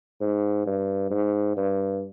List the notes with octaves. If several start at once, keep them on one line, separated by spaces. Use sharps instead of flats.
G#2
G2
G#2
G2